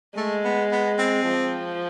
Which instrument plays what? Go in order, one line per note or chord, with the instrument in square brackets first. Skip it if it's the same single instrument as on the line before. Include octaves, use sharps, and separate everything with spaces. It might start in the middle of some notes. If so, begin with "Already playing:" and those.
[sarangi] G#3 [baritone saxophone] A3
[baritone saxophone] B3
B3
C4
[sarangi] F3